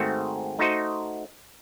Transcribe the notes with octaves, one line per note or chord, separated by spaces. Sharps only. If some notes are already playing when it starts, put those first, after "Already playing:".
Already playing: G#2 D#3 A3 C4 F#4
A3 D#4 F#4 C5 D#5